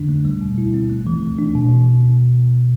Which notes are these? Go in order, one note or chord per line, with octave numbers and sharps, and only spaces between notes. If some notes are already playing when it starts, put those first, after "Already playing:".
Already playing: F2 D3 D4
A3
G3
B2
E4
C4
A3
E3
E3
D4
B2